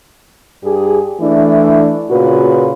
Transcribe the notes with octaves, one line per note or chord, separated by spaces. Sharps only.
G2 G4 G#4
E3 A3 D4 E4
A#2 C#3 F4 F#4 B4